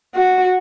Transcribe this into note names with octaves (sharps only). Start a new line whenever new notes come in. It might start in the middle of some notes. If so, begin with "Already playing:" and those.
F#4